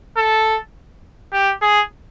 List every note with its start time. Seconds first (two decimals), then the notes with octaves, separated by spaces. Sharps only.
0.17 A4
1.33 G4
1.61 G#4